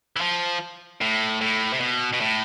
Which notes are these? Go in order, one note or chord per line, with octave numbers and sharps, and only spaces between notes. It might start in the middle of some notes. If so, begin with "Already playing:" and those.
E3
F3
A2
A2
C3
B2
B2
A2